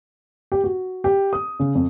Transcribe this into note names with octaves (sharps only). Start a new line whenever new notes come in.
G4
F#4
G4
D#6
C#3
F2